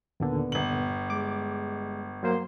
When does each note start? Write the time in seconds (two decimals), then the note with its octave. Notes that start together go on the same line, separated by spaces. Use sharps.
0.20 D#2 A#2 D3 B3
0.52 G1 F#7
1.10 G#3 D6
2.23 F#3 A#3 C5 C6